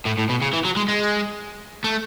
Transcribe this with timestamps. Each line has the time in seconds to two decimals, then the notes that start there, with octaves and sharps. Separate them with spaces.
0.05 A2
0.18 A2
0.29 B2
0.42 C#3
0.53 E3
0.65 F#3
0.77 G#3
0.88 G#3
1.84 A3